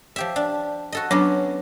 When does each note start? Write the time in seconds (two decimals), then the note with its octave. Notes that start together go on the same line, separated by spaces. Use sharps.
0.16 F3 G4 E5
0.36 D4
0.92 F#4 A4 D#5
1.11 F#3 B3 C#4 D4 D6